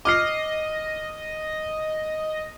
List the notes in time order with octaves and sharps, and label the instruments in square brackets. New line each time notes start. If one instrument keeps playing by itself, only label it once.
[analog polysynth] D#5 [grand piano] D6 F6 C7